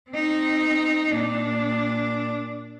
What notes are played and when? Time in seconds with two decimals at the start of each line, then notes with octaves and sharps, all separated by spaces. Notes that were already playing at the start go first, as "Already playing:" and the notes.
0.11 C4 D#4
1.13 A#2 D4